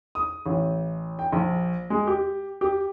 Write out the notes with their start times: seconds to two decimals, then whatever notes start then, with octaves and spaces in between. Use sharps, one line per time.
0.15 D#6
0.46 A1
1.19 G5
1.33 A#1
1.90 G#3
2.07 G4
2.61 G4